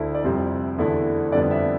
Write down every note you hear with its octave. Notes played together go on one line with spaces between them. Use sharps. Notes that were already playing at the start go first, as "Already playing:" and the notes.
Already playing: D2 D3 A3 E4
D5
F2 C3 G3 C5
E2 D3 A3 E4
F2 D3 G3 B3 D5
E5